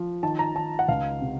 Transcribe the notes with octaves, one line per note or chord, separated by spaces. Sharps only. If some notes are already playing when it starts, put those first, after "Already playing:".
Already playing: F3
D#3 A5
A#5
D#3 A5
F#5
C#2 F5
C3